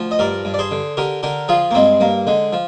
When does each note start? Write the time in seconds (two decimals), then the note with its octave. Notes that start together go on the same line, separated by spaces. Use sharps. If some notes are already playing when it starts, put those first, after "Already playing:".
Already playing: D2 F3
0.11 D#5
0.19 G2 A#4 D5
0.45 G2
0.54 D5
0.59 G#4 C5
0.71 D3
0.97 D3 G4 A#4
1.23 D3 G4 A#4
1.48 F3 F4 G#4
1.71 A#3
1.74 G2 G#3 C4
2.00 G2 A#3
2.27 D3 G#3
2.53 F3